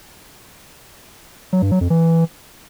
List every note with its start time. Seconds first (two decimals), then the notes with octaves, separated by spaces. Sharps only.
1.53 F#3
1.62 G2
1.71 F#3
1.81 F2
1.90 E3